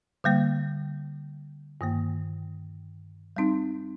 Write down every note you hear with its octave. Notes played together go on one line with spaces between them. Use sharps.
D3 G3 A#3
G2 D#3 A#3
G3 C4 D#4